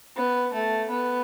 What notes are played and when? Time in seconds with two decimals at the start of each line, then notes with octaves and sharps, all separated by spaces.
0.16 B3
0.54 A3
0.90 B3